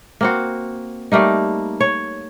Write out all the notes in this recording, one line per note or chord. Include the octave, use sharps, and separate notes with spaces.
A#3 C4 F#4
G3 A3 A#3 D#4
C#5